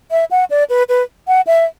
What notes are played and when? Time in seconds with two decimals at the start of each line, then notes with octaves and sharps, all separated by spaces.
0.11 E5
0.31 F#5
0.50 D5
0.70 B4
0.89 B4
1.28 F#5
1.47 E5